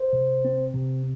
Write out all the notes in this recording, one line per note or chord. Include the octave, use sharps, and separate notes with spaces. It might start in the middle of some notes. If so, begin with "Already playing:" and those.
Already playing: C5
C3
C4
C3